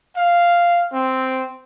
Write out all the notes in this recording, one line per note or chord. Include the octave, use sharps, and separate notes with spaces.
F5
C4